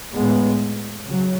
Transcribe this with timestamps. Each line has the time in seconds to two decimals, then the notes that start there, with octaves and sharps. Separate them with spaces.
0.14 A2 G#3 B3
1.06 C#3 F#3